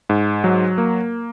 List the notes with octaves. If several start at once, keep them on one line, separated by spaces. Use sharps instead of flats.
G#2
F#3
A#3